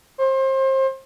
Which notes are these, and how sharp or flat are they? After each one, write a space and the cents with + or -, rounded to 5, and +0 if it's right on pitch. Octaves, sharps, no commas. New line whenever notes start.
C5 +30